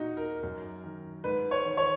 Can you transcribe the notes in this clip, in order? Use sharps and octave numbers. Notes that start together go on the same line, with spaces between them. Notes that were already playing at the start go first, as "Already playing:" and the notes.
Already playing: A#2 D#4 F#4
A#4
F#2
D#3
G#2 B4
C#5
D#3
C#5